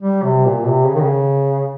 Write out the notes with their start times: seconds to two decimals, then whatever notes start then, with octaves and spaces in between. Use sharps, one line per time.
0.02 G3
0.23 C3
0.45 A#2
0.66 C3
0.87 C#3
0.94 D#3
1.02 C#3